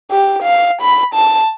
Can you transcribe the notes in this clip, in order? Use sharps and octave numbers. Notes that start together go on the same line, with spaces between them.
G4
F5
B5
A5